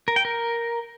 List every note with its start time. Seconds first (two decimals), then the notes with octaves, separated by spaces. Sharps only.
0.08 A#4
0.16 G5
0.25 A#4